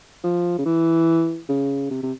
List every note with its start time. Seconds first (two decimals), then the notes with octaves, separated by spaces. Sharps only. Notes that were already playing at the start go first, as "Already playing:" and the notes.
0.24 F3
0.58 C#3
0.66 E3
1.49 C#3
1.91 C3
2.03 C3